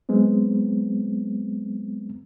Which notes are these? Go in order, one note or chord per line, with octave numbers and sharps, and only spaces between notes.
F#3 G#3 B3 C4